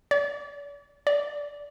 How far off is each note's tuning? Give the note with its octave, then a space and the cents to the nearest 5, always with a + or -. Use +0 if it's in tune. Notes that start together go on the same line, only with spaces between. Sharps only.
D5 -35
D5 -15